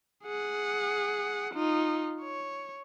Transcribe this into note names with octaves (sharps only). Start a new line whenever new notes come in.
G#4 F#5
D#4 F4
C#5